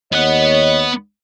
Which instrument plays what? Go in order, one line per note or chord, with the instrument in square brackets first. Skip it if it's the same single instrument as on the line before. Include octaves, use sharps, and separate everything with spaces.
[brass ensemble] D#2 C#5 D#5 [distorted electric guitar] B3 F#5